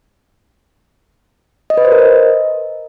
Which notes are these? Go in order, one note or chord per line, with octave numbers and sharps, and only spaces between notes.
D#5
B4
C5
A#4
D#5